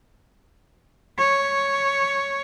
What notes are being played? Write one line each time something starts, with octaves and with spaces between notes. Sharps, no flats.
C#5